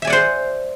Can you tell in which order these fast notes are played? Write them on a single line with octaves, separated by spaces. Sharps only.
E5 G#5 D5 F#5 C5